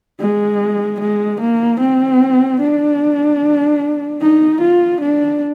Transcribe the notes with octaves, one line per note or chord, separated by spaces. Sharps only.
G#3
G#3
A#3
C4
D4
D#4
F4
D4